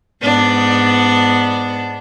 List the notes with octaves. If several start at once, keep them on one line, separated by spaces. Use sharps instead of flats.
G#2 B3 D4